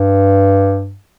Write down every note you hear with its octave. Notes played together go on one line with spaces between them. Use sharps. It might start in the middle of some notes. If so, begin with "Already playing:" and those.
Already playing: G2